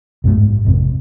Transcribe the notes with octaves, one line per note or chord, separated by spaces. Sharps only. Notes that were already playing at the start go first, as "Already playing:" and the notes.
B1 F#2 E3 A3
G#2
G#1 F2 C3